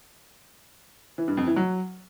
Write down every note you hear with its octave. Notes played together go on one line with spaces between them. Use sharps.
E3
G2
F2
E3
F#3